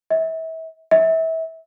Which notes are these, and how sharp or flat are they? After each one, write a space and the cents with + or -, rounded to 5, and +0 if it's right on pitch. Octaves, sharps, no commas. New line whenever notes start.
E5 -35
E5 -30